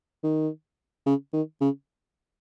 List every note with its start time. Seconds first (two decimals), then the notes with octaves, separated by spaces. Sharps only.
0.23 D#3
1.06 C#3
1.33 D#3
1.61 C#3